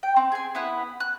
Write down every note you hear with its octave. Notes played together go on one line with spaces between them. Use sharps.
G5
C4
G#4 G#5
B3 E4 B4 F#5
F#6